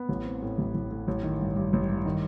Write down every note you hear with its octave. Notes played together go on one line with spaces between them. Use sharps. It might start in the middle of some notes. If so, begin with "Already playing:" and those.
Already playing: B3
A1
C4
A2
A1
A1
A2
A1
D#3
G2
G2
A1
G2
D#3